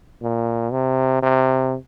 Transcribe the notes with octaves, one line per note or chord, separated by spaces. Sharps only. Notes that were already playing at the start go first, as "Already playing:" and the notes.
A#2
C3
C3